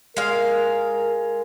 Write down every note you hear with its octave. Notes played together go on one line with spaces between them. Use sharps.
G#3 A#4 F5